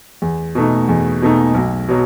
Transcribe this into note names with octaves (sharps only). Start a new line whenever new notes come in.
E2
B2 A3 D#4
E2
B2 A3 D#4
B1
B2 F#3